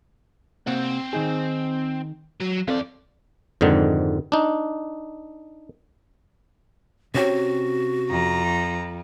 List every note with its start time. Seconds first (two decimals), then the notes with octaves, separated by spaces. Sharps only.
0.67 C3 A#3 C4 F#5
1.13 D#3 D#4 G#4
2.40 F#3
2.68 E2 C4 A4 D5 F5
3.61 F2 G#2 D3 D#3
4.32 D4 D#4
7.15 C3 C#4 F#4 G5
8.10 F2 A#5